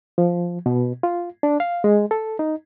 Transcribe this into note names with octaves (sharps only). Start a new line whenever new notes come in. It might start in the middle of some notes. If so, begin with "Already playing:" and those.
F3
B2
F4
D4
F5
G#3
A4
D#4